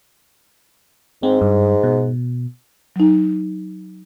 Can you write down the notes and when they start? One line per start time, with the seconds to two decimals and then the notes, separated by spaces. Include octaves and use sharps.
1.23 G#2 C4
1.41 G2
1.83 B2
2.96 F#3 D#4